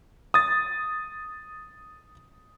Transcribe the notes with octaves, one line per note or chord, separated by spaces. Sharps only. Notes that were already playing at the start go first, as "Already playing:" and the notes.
D#6 A6